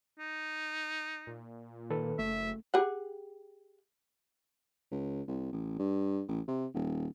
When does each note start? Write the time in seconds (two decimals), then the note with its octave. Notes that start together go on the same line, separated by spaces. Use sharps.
0.19 D#4
1.27 A#2
1.90 D#3 A4 B4
2.19 F#1 A3 E5
2.74 G4 G#4 F#5
4.91 C#2
5.28 C2
5.53 A1
5.79 G2
6.29 A1
6.48 C3
6.75 D#1